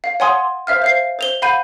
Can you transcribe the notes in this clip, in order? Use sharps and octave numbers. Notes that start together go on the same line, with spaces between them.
F5
C#5 F#5 G#5 C6 D#6
C5 E5 F5 F6
C5 F5 C7
C5 F7 G7
F5 F#5 B5 G6 D#7